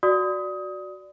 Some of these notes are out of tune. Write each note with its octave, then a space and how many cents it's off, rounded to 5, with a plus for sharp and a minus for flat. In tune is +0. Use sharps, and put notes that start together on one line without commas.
F#4 +0 D5 +0 D#6 +20